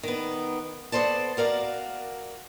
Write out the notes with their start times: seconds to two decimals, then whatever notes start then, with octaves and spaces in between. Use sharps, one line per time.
0.03 D#3 B3
0.92 B3 A4 C5 D5 A5
1.37 F#4 A#4 D5 F5